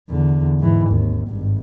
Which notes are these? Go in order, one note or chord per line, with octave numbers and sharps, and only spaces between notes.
E2 D3
G#2 E3
G#1 D#2
G#1 G2